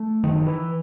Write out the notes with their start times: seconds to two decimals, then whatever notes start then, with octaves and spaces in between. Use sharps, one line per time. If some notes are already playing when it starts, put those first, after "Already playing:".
Already playing: A3
0.23 F#1 D#3
0.47 E3